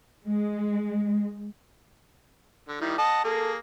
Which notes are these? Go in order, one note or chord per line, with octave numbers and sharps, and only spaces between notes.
G#3
D3
D#3 G3 E4
D#5 F#5 A5
A#3 G#4 A4